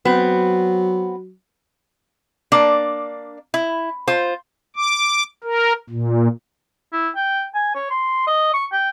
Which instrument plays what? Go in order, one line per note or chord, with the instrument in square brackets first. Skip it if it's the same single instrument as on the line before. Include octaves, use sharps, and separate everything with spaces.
[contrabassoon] F#3 [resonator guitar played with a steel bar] B3 C4
[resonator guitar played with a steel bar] A#3 D4 D5
E4
F4 C5
[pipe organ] D6
A#4
A#2
[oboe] E4
G5
G#5
C#5
C6
D#5
C#6
G5